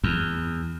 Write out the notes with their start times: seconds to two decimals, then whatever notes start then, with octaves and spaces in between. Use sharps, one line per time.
0.04 E2